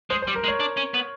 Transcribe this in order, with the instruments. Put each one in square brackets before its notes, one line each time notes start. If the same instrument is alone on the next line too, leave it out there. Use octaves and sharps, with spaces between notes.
[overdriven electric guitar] G#3 [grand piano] C5
[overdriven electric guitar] G3 [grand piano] C5
[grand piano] A#4
[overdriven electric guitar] G#3
[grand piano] C#5
[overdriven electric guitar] D4
C#4
B3